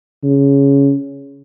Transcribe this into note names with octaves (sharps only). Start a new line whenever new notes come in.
C#3